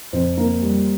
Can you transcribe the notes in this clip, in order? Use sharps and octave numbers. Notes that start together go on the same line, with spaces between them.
F2 C5
A#3
G3